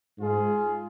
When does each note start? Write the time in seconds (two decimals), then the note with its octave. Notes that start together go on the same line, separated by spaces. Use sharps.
0.18 G#2 G#3 F4 G#4